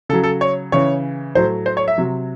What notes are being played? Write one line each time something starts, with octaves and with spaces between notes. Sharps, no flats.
C#3 F#3 A4
A4
C#5
C#3 E3 C#5
A2 F#3 C5
C5
C#5
E5
C3 F#3